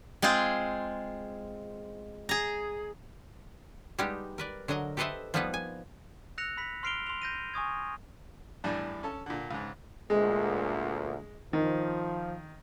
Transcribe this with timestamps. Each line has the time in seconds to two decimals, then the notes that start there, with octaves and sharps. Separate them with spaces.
0.22 G#3 C4 F4 G#4 C5
2.29 G#4 A#5
3.99 G3 G#3 B3 D#4 G4
4.38 A#4 B4 D5
4.68 D3 F#3 A#4 D#5 A#5
4.97 G4 A4 B4 C5 D#5 E5
5.34 F3 G3 A#3 B3 D#4 B4
5.54 G#5
6.38 E6 F#6 A#6 C#7 F7
6.57 B5 B6
6.83 C6 F6 C7 D7 F7 G7
7.07 C6 F7
7.22 G6 A#6 D#7
7.54 G#5 C#6 D#6 G#6
8.64 E2 A2 G3 D4
9.03 C#4 A4 A5
9.26 A#2 D3
9.51 C#2 G#2
10.10 D2 A#2 G#3
11.53 D#3 F3